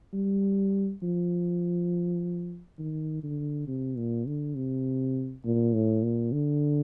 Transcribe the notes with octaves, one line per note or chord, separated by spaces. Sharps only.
G3
F3
D#3
D3
C3
A#2
D3
C3
A#2
A2
A#2
D3